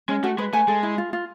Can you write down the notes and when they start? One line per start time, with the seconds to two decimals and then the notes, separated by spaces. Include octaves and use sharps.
0.08 G#3 C#4
0.23 A3 F#4
0.38 G#3 B4
0.53 A3 G#5
0.68 G#3 A4
0.83 E4
0.98 F4
1.13 F4